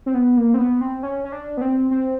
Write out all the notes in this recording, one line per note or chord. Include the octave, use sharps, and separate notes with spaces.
C4
B3
A#3
C4
B3
C4
C#4
C#4
D4
B3
C4
C4